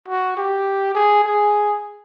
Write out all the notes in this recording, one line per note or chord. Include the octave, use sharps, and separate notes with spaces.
F#4
G4
G#4
G#4